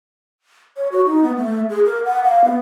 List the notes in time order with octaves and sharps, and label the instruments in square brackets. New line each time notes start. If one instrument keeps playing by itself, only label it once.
[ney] C#5
F#4
D#4
B3
A3
G#4
A#4
F#5
F5
B3